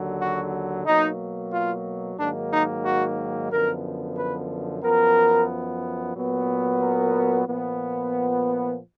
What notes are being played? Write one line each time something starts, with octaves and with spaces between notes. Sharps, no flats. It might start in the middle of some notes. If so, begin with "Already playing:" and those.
Already playing: D#2 D3 F#3
F#4
B2 F#3 A#3 D#4
F4
G#2 D#3 F#3 A#3 D4
D#4
F#4
F#2 D3 F3 B3 A#4
B4
F#2 F3 B3 A#4
A#2 F#3 B3
A#4
A#2 F3 B3